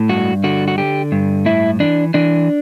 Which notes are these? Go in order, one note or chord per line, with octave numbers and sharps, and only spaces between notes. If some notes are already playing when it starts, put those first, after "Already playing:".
Already playing: A2
G2 F#4
D3 F#4
F#4
D3 G4
G2
A2 E4
E3 D4
E3 D4